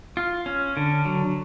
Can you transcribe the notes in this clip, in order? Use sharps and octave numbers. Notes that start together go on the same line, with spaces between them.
F4
C#4
D3
F#3